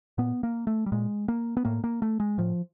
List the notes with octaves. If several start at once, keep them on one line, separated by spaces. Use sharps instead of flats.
A#2 B3
A#3
A3
G3
A#2 G#3
A#3
B3
A2 A#3
A#3
A3
G#3
A2 F3